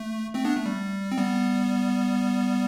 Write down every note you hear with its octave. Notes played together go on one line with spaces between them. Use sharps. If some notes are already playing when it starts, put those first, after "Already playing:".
Already playing: A3
A3 C4
B3 D4
A3
G3
C4
G3 B3